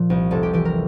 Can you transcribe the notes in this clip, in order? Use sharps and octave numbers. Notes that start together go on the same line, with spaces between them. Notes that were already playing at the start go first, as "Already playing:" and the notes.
Already playing: A#2 F3
C2
F1 A4
G4
E3 G4
A#4